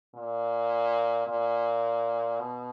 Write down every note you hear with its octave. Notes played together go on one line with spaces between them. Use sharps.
A#2
A#2
B2